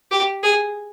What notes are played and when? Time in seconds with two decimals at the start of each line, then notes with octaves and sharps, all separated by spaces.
0.11 G4
0.43 G#4